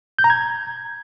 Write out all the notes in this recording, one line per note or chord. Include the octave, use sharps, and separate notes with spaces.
G6
A#5
G#6